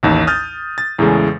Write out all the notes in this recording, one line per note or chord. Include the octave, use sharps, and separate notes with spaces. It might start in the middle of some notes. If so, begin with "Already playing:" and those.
A1 D#2 D#4
D#6 F6 G6 A6
A6
E2 A2 C#3 G#3